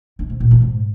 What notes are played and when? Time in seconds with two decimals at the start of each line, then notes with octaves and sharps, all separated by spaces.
0.19 D3
0.30 C3
0.40 A#2
0.51 E3
0.62 G#2